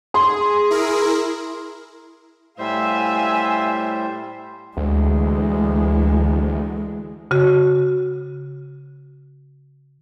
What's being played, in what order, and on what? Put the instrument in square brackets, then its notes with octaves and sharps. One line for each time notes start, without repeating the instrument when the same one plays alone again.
[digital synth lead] G#4 [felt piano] C6
[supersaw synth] E4 A#4
[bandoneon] A2 G3 C5 [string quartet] E5 F5 G#5
[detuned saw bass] D2 [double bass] E3 G#3
[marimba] C#3 F#4